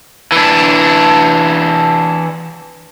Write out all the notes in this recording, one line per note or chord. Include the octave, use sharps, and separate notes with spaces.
E3 D4